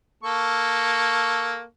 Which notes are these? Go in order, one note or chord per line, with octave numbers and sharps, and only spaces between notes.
A#3 A4 C#6